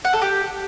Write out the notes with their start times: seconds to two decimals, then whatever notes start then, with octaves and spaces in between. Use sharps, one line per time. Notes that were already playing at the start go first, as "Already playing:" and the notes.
0.05 F#5
0.13 A4
0.22 G4